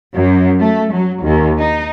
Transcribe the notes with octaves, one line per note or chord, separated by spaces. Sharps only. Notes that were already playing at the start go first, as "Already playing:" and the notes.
F#2
A3
F#3
D#2
D#4